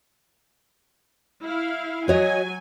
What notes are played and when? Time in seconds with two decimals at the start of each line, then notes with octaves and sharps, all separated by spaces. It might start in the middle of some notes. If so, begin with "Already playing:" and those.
1.44 E4 F5
2.08 F#3 F#4 C#5 D#5 G#5